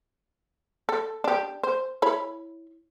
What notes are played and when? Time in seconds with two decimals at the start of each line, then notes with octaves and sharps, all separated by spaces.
0.89 A4
1.24 D4 G4
1.63 C5
2.02 E4 C#5 B5